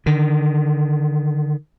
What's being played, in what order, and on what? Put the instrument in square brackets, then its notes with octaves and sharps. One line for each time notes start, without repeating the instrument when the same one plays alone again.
[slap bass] D3 D#3